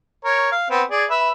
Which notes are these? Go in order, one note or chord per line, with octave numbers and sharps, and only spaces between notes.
A#4 C#5
F5
B3 C4
G#4 D5
B4 E5